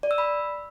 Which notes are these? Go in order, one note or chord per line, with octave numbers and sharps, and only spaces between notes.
D5
E6
B5